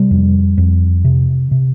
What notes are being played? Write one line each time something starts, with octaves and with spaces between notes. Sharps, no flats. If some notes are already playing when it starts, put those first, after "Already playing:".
Already playing: C3 G3
F2
F2
C3
C3